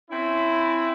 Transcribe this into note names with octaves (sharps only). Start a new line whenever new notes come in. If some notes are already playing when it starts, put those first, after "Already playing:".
C4 C#4 E4